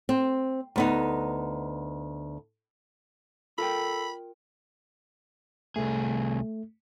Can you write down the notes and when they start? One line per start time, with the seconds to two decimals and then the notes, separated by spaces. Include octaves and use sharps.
0.09 C4
0.76 D2 B3 D#4
3.58 F4 A4 A#4 G5 B5
5.76 C2 A3 G#4